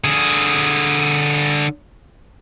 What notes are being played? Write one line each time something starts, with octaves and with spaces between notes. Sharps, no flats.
D3 G#4